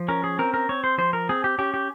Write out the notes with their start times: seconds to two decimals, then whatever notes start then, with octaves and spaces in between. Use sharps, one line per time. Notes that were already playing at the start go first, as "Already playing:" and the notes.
Already playing: F3
0.08 C#4 A#4
0.24 G#4
0.39 C4 A#4
0.54 A#4
0.69 C4 C#5
0.84 C5
0.98 F3 C5
1.13 A#4
1.29 C4 G#4
1.44 G4
1.58 C#4 G4
1.74 G4